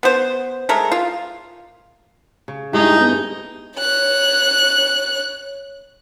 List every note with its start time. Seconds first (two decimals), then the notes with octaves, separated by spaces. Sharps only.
0.03 B3 C5
0.69 G#3 A3 A#4
0.92 F4
2.48 C#3
2.73 G2 G#3 A3 D#4 E4 G4
3.01 B3 G6
3.77 C#5 F#6